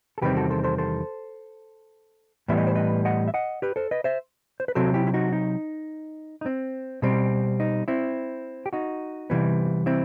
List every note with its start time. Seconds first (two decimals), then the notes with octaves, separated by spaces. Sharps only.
0.18 A4
0.22 E2 C3 D#3 G3 C4 G4 B4
0.37 F#4 A4
0.50 A4 C5
0.64 A4 C5
0.78 A4 C5
2.48 A2 E3 G3 B3 E5
2.58 D#5
2.67 C5
2.75 B4 D#5
3.05 D#5 F#5
3.28 E5
3.34 D#5 F#5
3.62 G4 B4
3.76 A4 C5
3.91 B4 D#5
4.04 C5 E5
4.60 C5
4.68 B4
4.75 C3 F#3 C4 F#4 A4
4.94 E4 G4
5.07 E4
5.14 D#4 F#4
5.33 D#4
6.41 D#4
6.46 C4
7.02 B2 G3 C4
7.60 D#4
7.88 C4 E4
8.66 G4
8.73 D#4 F#4
9.30 C3 E3 G3 B3
9.86 C4 E4